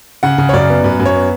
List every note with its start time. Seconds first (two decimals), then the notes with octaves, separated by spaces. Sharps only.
0.23 C#3 F#5
0.38 C#3
0.49 C#5
0.53 F#2 D5
0.69 B3
0.84 F#2 B4
1.00 F#2
1.06 C#5
1.15 B3